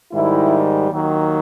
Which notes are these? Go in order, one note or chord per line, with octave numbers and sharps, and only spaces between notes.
G#2 D#3 G3 E4
D#2 D#3 F#3